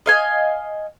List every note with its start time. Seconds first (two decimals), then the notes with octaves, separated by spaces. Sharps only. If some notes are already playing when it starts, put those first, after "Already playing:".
0.06 D#5 F5 G#5